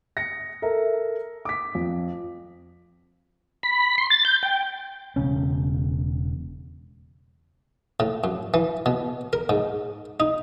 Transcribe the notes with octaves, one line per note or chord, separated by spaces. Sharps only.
A#6 C#7
A4 A#4 E5
D6 B6
F2
B5
C6
A6
G6
G5
E1 C#3 C#4
A2
F#2
E3
B2
A#4
G#2
D#4